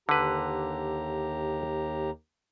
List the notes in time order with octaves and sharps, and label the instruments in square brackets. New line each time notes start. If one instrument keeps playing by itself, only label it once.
[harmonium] D#2 G4 A#5 [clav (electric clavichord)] D3 B4